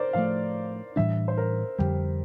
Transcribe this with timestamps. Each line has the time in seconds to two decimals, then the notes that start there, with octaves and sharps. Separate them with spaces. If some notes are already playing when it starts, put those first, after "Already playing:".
Already playing: A#4 C5 D5
0.13 A2 F3 A3 F5
0.96 A2 E3 G3 D4 E5
1.28 C5
1.38 A#4
1.79 F2 D3 G3 G4